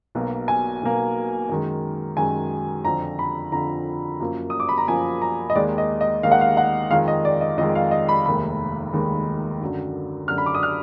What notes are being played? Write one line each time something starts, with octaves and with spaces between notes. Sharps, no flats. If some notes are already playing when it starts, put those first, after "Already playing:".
B1 B2 A#3
G#5
B1 B2 A#3
F#2 D#3 G#3
F#2 D#3 G#3 G#5
F2 D3 F3 A#5
B5
F2 D3 F3 A#5
F#2 F3 A#3
D#6
D6
B5
A#5
F#2 F3 A#3 G#5
A#5
D#5
D#2 D#3 G#3 D5
D#5
D#5
D#2 D#3 G#3 F5
F#5
F5
F#5
F2 D#3 G#3 F5
D#5
D5
D#5
F2 D#3 G#3 D#5
F5
D#5
B5
F1 D#2 D#3 G#3 B5
F1 D#2 D#3 G#3
F#2 D3 F#3
F#2 D3 F#3 F6
B5
D6
D#6
F6